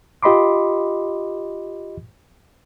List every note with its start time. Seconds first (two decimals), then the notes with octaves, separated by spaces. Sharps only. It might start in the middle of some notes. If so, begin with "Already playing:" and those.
0.23 F4 G4 D#5 B5 C6 D6